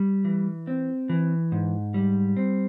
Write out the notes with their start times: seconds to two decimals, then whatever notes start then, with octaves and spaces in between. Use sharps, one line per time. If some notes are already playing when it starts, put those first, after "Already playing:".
Already playing: G3
0.25 E3
0.67 C4
1.09 E3
1.52 G#2
1.94 G3
2.37 C4